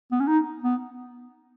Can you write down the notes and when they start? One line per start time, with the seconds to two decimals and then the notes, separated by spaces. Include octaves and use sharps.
0.12 B3
0.20 C#4
0.27 D#4
0.64 B3